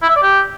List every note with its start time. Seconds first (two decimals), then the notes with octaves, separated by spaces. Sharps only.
0.02 E4
0.09 E5
0.16 D5
0.22 G4